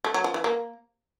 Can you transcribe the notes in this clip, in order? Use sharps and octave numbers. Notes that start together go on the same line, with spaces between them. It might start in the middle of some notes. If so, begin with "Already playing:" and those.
A3
F#3
F3
E3
A#3